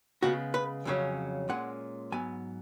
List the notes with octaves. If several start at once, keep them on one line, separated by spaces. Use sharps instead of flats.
C#3 G#3 B3 F#4
B4
F2 C#3 F#3 C#4
A#2 G#3 C#4 F#5
G#2 F#3 B3 G#5